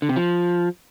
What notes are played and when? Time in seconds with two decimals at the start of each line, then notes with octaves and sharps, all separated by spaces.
0.02 D3
0.09 C3
0.16 F3